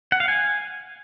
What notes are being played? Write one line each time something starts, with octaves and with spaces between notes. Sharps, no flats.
F#5
F5
G#5